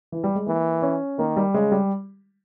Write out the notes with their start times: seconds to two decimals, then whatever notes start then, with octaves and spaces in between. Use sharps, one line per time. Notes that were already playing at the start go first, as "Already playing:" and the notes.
0.12 E3
0.24 G3
0.35 G#3
0.47 E3 A#3
0.82 C#4
1.18 D#3 A#3
1.37 G3
1.54 C#3 G#3
1.72 G3